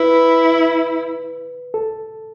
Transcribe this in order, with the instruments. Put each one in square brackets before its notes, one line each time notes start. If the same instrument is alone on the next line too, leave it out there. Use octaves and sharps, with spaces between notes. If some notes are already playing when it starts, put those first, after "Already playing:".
Already playing: [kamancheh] E4 [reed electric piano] B4
[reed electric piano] A4